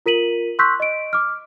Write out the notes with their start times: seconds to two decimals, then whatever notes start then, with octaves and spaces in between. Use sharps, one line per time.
0.06 F4 A#4 B6 D#7 F#7
0.59 C6 C#6 E6 F#6 G6 B6
0.80 D#5 D7
1.13 D6 F6